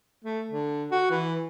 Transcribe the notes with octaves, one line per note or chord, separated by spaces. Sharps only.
A3
D3
F#4
E3